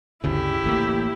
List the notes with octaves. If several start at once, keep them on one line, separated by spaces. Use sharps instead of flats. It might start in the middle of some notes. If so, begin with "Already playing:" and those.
G1 D2 C#3 E4 G4
A1 A2 A#3